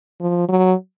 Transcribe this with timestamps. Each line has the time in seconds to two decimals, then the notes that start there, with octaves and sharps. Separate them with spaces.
0.21 F3
0.49 F#3